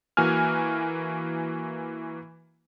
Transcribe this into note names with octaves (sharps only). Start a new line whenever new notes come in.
E3 A#3 F#4 G#5 F6